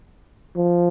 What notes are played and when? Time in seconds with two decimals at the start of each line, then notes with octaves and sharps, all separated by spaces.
0.56 F3